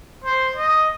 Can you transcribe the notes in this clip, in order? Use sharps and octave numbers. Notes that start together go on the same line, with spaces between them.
C5
D#5